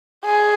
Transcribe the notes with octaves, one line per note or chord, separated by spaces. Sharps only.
G#4